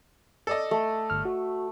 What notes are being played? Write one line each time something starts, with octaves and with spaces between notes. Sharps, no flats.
A4 D5 D#5
A3
G1 F6
F#4